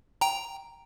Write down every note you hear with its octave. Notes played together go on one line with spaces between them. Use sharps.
G5 A#5